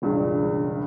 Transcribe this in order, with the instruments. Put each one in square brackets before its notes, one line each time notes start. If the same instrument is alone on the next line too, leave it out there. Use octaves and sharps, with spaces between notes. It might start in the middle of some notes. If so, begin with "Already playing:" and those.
[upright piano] E1 C#2 G2 C#3